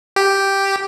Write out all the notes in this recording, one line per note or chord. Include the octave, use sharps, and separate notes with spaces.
G4